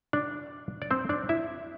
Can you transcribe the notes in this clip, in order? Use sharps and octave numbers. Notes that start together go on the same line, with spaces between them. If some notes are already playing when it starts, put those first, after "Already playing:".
D4 D5
D5
C4 C5
D4 D5
E4 E5